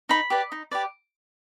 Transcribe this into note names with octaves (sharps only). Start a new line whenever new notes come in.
D#4 B5
G4 B4 D5
D#4
G4 B4 D5